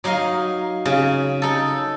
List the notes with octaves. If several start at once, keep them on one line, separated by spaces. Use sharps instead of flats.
F#3 D#4 D#5 F5
C#3
D#4 A4